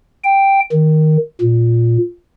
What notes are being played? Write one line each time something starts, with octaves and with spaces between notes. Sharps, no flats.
G5
D#3
A#2